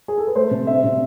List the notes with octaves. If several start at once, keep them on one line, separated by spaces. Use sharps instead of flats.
G#4
A4
B4
A3 C5
C3
D4 E5
C3